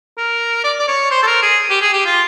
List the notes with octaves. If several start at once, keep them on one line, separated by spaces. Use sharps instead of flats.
A#4
D5
D5
C#5
C5
A4
A#4
G#4
G4
G#4
G4
F4